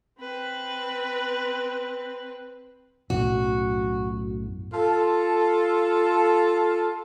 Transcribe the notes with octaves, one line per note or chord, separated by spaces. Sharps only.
C4 B4
B1 F#2 A2 F#4
F4 A4